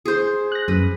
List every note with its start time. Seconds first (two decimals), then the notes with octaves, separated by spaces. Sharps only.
0.05 G#4 C5
0.52 F#6 A#6
0.68 F#2 B4